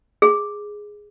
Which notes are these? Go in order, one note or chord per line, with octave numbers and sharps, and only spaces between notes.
G#4